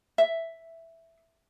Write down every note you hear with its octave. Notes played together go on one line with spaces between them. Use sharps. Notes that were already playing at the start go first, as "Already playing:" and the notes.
E5